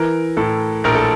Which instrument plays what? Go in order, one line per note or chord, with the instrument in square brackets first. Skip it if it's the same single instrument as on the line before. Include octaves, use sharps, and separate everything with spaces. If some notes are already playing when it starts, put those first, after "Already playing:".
Already playing: [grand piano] E3 A#4
A2 A4
A#1 A#4
A4